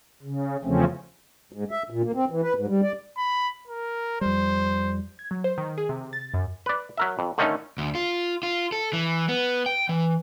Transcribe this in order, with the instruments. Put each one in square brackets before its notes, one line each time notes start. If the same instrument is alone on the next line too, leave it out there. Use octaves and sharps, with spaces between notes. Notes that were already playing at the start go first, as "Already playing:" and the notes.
[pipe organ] C#3
E2 C#3 F3 A3 C4 C#4
[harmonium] G#2
E5
A#2
A#3
C4
E3
B4
G#2
G3
D5
[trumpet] B5
A#4
[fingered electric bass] F2 G3 [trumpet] C5
[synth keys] G#6
F#3
C5
D#3
G#4
C3
A6
F#2
[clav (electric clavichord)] B4 D5
F#3 A#4 E5
F2
D3 D#3 A3 C#4 D#4
[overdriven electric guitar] D2
F4
F4
A4
E3
B3
G5
E3